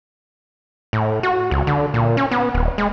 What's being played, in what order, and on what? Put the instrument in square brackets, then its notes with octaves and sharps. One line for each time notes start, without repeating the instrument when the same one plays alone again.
[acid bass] A2
F#4
C#2
D3
A#2
C#4
B3
D#1
G#3